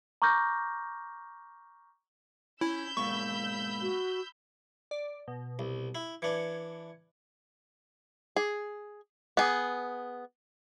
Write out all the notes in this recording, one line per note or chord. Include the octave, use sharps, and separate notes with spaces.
A#5 C#6 D6 F6 G6 A#6
C#4 E4 B5 E6 G6
G#2 B2 A#3 C#6
F#4
D5
B2
C2
E4
E3 D4 G#6 C#7
G#4
B3 G#4